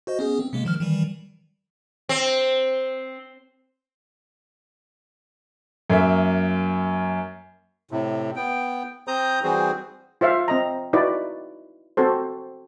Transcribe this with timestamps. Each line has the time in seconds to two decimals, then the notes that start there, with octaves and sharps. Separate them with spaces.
0.07 F#4 C5 D#5
0.19 B3 C#4 G#4
0.39 C4
0.53 C3 G#3 A#3
0.65 D#3 F3 F6
0.80 D#3 E3 G3
2.09 C4
5.90 F#2 A#3 E5
7.91 A2 C3
8.36 B3 G5
9.08 C4 C5 A#5 D#6 G6
9.44 E3 G3 C4 F#4 G#4 C5
10.21 F4 C5 E5 F5
10.48 C4 D#5 A#5
10.93 D#4 E4 F#4 B4 D5
11.97 C4 F#4 A4 C5